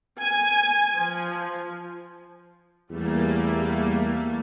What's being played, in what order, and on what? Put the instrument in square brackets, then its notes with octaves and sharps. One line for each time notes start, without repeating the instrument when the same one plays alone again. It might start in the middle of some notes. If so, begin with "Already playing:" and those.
[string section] G#5
F3
[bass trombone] E2 [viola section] G3 A3 A#3